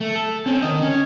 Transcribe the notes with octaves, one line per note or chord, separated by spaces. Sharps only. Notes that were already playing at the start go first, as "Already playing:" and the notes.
A3
A4
C4 C#4
D#3 D#5
C#4